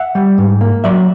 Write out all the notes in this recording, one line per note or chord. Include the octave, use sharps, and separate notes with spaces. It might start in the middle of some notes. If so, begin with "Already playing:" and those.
Already playing: E5 F#5
G3
G#2
A#3
F#3 D5 E5